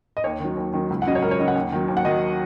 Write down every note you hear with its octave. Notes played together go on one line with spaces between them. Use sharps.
D#5
D#2 C#5
D#3 F#3
D#2
D#3 F#3
C#2
F#5
C#3 F#3 D#5
C#5
C#2 A#4
C#5
C#3 F#3 D#5
F#5
D#2
D#3 F#3
D#2
F#5
D#3 F#3 D#5